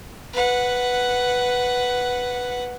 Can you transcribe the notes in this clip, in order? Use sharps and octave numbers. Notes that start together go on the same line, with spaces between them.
B4 F#5